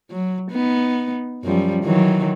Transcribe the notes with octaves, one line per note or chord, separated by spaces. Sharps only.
F#3
B3 D#4
F#2 F3 G3
D#3 E3 F#3